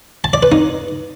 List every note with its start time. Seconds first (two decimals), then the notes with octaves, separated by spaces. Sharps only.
0.24 A5
0.33 D5
0.43 B4
0.52 D#4